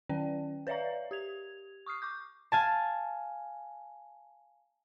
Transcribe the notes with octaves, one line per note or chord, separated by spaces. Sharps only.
D#3 C#4 D5 G5
B4 C#5 D5 E5 F5 A#5
G4 G#6 F7
C#6 D#6 F6 C7
C#6 D6 G6
F5 G#5 A5